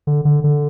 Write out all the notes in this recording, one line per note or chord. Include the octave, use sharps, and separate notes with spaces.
D3
D3
D3